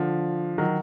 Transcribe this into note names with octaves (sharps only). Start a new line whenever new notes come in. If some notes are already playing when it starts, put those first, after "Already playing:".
Already playing: D3 F3
D#3 F#3